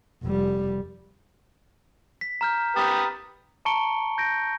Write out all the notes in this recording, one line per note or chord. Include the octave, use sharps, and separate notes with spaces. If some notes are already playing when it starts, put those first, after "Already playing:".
F1 G3
B6
A#5 F6 G6
G4 B4 A#5 D#6 A6
A5 A#5 C#6 C#7 D7 G7
G6 A#6 D7